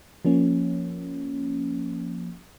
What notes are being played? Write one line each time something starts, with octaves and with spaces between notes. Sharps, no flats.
F3 A#3 C#4